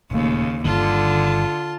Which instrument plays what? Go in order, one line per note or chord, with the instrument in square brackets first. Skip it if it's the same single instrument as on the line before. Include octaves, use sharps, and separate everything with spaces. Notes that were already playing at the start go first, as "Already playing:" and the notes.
[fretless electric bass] D#1 A3 [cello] D#2 C#3
[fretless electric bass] G1 G2 D#3 [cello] D3 [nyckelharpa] F4 A5